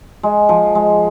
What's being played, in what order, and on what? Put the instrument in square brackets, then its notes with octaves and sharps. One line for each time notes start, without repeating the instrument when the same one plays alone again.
[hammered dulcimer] G#3
F3
G#3